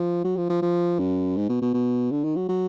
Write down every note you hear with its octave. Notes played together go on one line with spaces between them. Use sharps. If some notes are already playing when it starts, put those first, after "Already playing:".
Already playing: F3
F#3
F3
F3
F3
F#2
G#2
B2
B2
B2
D3
D#3
F#3
F#3